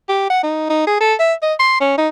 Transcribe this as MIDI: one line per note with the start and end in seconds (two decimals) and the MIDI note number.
0.09 0.29 67
0.30 0.40 78
0.43 0.67 63
0.70 0.84 63
0.87 0.96 68
1.00 1.14 69
1.19 1.33 76
1.42 1.54 75
1.59 1.76 84
1.81 1.96 61
1.98 2.08 63